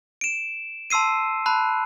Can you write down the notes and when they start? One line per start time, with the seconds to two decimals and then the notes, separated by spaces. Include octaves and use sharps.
0.21 D7 E7
0.90 A5 C6 E6 C7 D#7
1.46 A5 B5 F#6